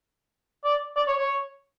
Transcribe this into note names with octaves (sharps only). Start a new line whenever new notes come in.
D5
D5
C#5
C#5